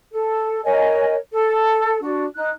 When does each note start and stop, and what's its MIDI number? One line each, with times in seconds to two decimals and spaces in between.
0.11 0.60 69
0.63 1.14 70
0.63 1.14 73
0.63 1.14 75
0.63 1.14 80
1.31 1.97 69
2.01 2.23 62
2.01 2.23 66
2.36 2.49 63
2.36 2.49 90